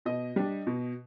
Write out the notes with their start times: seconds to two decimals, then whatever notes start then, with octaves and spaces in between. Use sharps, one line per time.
0.05 B2 D#5
0.36 G3 D4
0.67 B2